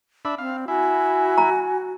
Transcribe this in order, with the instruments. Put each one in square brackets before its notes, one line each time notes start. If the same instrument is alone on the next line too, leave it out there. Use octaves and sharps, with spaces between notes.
[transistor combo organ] D4 E5 B5
[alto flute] C4 [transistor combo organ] F5
[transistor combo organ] E4 [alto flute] F#4 [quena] G#5
[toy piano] A#5